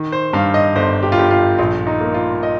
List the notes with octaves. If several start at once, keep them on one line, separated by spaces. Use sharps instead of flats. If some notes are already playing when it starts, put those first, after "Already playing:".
Already playing: D#3
C5
G2 F5
D#5
G1 C5
G4
F4
G1 G4
F4
A#1 F4
D#4
A#3
F4
D#5